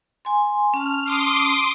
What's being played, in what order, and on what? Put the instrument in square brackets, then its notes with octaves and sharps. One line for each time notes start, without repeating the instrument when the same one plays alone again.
[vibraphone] G#5 C6
[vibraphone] C#4 A5 [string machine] F6
[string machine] C6 D6 D#6